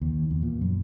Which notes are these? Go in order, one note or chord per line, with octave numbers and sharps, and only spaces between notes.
D#2
E2
A#2
F#2